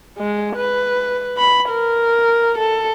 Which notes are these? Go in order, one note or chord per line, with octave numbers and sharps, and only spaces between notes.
G#3
B4
B5
A#4
A4